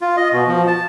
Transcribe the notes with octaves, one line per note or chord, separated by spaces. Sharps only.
F4
D#5
B2
F3
A5